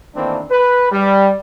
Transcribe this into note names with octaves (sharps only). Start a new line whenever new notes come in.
D#3 E3 A3 A#3 C4 D4
B4
G3